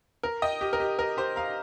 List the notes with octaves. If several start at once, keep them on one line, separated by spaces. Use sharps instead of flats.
A#4
D#5 G5
G4
A#4
G4
A#4
G4 C5
F5 A#5